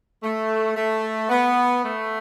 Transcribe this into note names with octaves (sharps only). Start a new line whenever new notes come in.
A3
A3
B3
A3